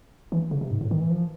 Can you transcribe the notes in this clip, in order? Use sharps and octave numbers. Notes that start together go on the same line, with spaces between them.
E3
C#3
C3
G#2
A2
D#3
E3
F3